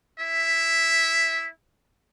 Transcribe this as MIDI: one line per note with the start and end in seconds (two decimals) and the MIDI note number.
0.20 1.48 64
0.20 1.48 76